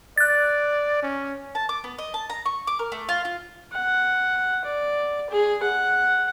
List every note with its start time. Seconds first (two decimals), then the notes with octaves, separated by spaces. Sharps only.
0.18 D5 F#6 A6
1.03 C#4
1.55 A5
1.69 D6
1.84 B3
1.99 D#5
2.14 A5
2.30 A#5
2.45 C#6
2.67 D6
2.79 A#4
2.92 A3
3.09 F4
3.25 F4
3.73 F#5
4.65 D5
5.30 G#4
5.63 F#5